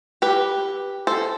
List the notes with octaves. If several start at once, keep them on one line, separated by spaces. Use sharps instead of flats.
G4 B4
A4 C5